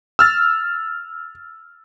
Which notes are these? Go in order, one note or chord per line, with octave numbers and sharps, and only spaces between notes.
E6 F6 A6